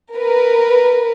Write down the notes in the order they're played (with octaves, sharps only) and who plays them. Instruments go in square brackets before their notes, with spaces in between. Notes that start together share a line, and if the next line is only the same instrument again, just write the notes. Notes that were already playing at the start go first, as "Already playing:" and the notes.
[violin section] A#4 B4